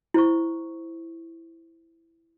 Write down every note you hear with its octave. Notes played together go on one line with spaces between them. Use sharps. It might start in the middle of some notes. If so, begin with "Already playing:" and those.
E4 C5 C#6